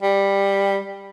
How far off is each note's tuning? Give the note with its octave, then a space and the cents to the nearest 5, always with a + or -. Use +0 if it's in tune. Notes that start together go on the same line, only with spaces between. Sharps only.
G3 +10